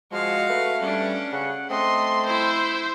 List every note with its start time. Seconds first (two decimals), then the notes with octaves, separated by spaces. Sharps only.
0.12 F3 G#3 F#4 F5
0.49 A3 B4
0.81 G3 C#4 D4
1.32 C#3 F#5
1.70 A3 C4 D#5 C6
2.26 E4 C5 E5